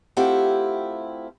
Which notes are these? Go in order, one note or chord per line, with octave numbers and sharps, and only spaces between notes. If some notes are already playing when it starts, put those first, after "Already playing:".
A3 C4 E4 F4 G4 F#5